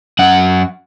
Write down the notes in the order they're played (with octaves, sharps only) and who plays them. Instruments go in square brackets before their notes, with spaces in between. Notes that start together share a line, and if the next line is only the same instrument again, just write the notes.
[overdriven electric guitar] F#2 F#5